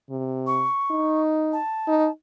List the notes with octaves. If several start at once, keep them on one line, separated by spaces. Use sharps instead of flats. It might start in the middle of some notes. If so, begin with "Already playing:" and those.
C3
C#6
D#4
A5
D#4